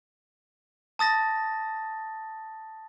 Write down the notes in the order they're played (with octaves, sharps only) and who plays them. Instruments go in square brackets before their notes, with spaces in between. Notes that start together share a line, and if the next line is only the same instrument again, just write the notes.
[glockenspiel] A5 D#6 A6 A#6